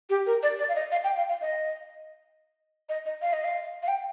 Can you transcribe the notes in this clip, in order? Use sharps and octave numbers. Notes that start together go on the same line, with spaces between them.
G4
A#4
D5
D5
F5
D#5
F5
G5
F5
F5
D#5
D#5
D#5
F5
D#5
F5
F5
G5